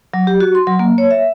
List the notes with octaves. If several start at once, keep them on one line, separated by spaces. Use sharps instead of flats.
F#3
G4
F#4
C6
F#3
A#3
C#5
E5